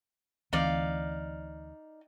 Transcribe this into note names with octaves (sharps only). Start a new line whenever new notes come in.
D2 E3 C4 D#4 D5 F5